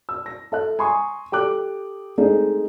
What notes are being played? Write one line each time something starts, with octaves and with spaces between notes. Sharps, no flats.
E6
A#6
A4 E5 F#6
G#5 A#5 C6 C#6 D#6
G4 A4 D6 F#6
G#3 A3 C4 D4 D#4 G#4